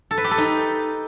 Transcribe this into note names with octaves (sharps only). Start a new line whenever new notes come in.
A4
B4
G4
A4
D#4